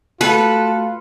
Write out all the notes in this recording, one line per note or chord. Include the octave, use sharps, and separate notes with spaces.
A3 F4 F#4 A4 B4 F#6